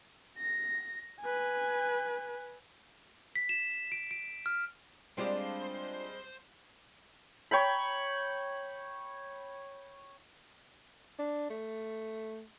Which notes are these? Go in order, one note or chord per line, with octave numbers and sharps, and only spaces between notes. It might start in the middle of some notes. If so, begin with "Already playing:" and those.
A#6
B4 G#5
B6
E7
D7
D7
F6
G3 G#3 C4 D4 F4 G4 C5
C#5 G5 B5
D4
A3